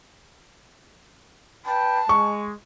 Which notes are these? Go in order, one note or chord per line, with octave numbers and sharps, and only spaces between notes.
B4 G5 A5 B5
G#3 C#6